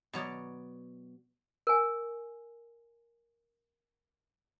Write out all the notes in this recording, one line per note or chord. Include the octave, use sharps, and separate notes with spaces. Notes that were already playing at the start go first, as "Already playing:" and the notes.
B2 F#3 C#5 D5
A#4 G#5